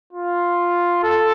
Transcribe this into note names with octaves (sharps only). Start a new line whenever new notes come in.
F4
A4